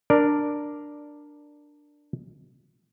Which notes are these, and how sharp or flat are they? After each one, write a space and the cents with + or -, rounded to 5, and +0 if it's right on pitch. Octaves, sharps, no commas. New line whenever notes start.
D4 +5 A#4 +0 D5 +0